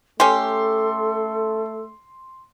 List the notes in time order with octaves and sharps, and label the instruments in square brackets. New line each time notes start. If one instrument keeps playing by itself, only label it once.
[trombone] A3 [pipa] C#4 G4 [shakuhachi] A4 [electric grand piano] C6